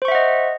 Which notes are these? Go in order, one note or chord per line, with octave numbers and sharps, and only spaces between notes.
C5 D#5 E5 F#5 C#6